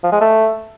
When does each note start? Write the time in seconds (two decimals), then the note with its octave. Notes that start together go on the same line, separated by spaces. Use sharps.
0.04 F3
0.12 G#3
0.21 A3